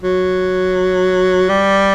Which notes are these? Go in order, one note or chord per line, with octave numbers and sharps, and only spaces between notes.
F#3
G3